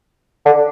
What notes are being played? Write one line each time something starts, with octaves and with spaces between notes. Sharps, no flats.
D3